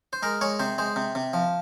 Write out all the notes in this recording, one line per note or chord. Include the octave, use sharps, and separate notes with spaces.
C5
G#3 A#4
G#3 C#5
C3 C5
G#3 C5
C3
C3
F3